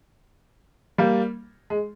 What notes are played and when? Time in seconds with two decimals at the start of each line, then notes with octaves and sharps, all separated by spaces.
0.98 G3 A#3
1.70 G#3